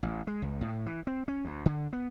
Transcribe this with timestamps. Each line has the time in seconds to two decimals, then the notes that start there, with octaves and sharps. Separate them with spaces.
0.03 A1
0.27 G#3
0.42 C#2
0.61 A2
0.86 E3
1.07 C4
1.28 C#4
1.45 D2
1.66 D3
1.93 B3